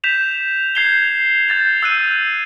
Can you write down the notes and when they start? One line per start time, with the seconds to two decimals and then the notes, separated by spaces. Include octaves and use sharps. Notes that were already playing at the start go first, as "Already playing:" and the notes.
0.04 G6 B6 E7 F7
0.75 G6 G#6 C7 F7 G7
1.49 G6 A6 F7
1.83 E6 F#6 D#7